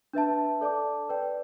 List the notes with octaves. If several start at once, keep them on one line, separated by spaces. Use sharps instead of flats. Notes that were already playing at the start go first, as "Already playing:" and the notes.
D4 B4 E5 A5
A4 D5 A5 D6
B4 D5 G5